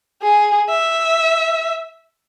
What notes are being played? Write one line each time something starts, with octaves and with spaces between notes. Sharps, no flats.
G#4
E5